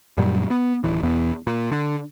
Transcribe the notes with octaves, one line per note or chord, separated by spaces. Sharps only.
F#2 A#2 F#3 G3
B3
D1 E3
E1 E2 E3 B3
A#2
D3